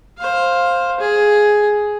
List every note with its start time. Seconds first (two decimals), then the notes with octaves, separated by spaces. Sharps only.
0.18 C5 F5
1.00 G#4